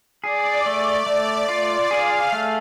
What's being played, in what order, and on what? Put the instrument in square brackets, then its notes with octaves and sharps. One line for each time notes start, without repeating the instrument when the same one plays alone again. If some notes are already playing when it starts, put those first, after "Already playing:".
[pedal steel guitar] G#4 [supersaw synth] D5
[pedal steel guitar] A3
A3
F4
[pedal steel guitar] G#4 [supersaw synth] F5
[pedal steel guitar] A3